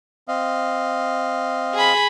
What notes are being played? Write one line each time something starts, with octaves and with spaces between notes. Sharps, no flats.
C4 D#5 F5
G#4 B5